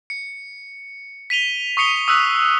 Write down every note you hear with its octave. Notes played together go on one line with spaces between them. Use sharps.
C#7
B6 D#7 F7 G7
C#6 D#6 C7 C#7 F7 G7
D#6 E6 F#6 B6